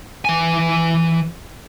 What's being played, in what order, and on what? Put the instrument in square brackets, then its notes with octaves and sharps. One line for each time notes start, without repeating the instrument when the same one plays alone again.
[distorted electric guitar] E3 G#5